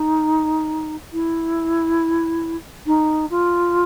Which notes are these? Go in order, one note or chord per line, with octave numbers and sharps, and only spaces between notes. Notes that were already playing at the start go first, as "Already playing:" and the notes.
Already playing: D#4
E4
D#4
F4